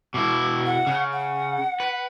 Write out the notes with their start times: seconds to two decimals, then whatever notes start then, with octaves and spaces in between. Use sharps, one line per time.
0.14 B2 E4 D6
0.66 F#5
0.87 C#3
1.13 F#5
1.80 B4